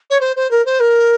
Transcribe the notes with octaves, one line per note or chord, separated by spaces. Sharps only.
C#5
C5
C5
A#4
C5
A#4